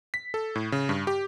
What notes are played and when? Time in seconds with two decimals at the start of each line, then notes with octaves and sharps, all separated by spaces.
0.14 B6
0.34 A4
0.55 A2
0.72 C#3
0.89 G2
1.07 G4